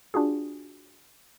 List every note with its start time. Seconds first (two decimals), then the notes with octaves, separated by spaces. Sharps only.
0.14 D4 F4 F#4 G#4